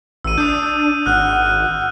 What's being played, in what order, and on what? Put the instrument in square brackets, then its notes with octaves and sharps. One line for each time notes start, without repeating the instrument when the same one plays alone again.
[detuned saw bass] A1 [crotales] E6 D#7
[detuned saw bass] D4 [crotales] D#6 G6
[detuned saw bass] G#1 [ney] F#5 [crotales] F6 F#6